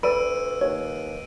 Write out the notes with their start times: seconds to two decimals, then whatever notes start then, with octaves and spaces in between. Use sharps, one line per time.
0.03 D2 B4 D5 B5 E6 D7 D#7
0.61 D#2 C#5